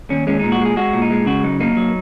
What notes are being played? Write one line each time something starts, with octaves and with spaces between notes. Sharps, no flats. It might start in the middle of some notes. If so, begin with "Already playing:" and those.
D#2 C#4
G#3 C#4
A#2 D#4
F#4
G#3 G#4
G#3 F#4
A#2
D#4
G#3
C#3 F#4
F#3 D#4
A#3 D#4
F#3